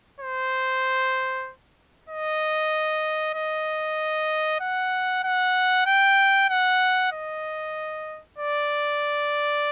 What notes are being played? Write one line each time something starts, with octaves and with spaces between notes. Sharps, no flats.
C5
D#5
D#5
F#5
F#5
G5
F#5
D#5
D5